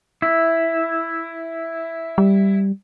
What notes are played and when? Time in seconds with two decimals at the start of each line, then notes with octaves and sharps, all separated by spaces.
0.22 E4
2.18 G3